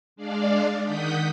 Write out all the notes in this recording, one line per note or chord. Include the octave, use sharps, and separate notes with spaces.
G#3 D4 D5 F5
D#3 F#5 D#6 G6 B6